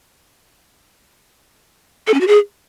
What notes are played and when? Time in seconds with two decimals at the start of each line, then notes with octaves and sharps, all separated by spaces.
2.07 A4
2.14 C#4
2.21 F#4
2.27 G#4